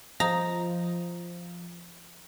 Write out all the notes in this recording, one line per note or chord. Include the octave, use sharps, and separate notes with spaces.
F3 C5 D#5 A#5 D#6